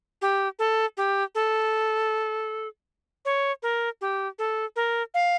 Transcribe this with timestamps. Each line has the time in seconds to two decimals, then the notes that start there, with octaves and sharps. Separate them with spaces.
0.22 G4
0.59 A4
0.97 G4
1.35 A4
3.25 C#5
3.63 A#4
4.01 G4
4.39 A4
4.76 A#4
5.14 F5